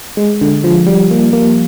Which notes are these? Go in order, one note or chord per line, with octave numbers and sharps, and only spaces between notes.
G#3
D3
F3
G3
A#3
A#3